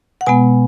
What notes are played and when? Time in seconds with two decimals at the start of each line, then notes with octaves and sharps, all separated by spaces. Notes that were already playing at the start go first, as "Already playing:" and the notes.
0.21 F#5
0.26 B2 G#3 B3 G#5